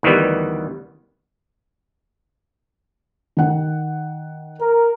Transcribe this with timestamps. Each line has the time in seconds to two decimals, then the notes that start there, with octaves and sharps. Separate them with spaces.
0.03 D2 D#3 E3 G3 B3
3.37 D#3 F#5
4.60 A#4